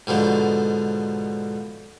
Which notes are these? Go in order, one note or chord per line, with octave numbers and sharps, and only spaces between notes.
G#2 B2 D3 F3